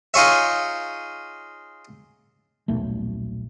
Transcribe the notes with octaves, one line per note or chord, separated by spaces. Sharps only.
D#4 F4 G#4 C#5 E5
D#1 B1 A3